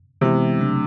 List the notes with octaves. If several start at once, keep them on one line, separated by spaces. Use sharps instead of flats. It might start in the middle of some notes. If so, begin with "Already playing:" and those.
C3 E3 G#3 B3 E4
C#3 F#3 A3 D4